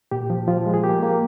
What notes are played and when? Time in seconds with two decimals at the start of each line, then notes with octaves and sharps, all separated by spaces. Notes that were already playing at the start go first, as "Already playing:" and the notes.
0.11 A#2 G4
0.30 F3
0.48 F3 F4
0.66 G#3
0.74 G#4
0.84 A#3 G4
1.03 A#3